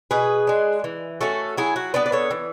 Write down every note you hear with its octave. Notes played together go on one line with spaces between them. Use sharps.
B2 G#4 B4
G#3 D4
E3
A3 C#4 F#4 A4
F#3 E4 G#4
F#4
B3 D4 B4 D5
D5
A4 C#5
E3